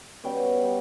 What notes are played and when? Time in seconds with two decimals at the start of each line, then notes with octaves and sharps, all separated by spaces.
0.24 B2 G3 C#4 G5
0.64 G3